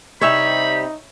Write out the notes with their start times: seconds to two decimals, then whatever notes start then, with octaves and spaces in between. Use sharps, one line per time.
0.21 C3 G3 D#4 G4 C#5 E5 B5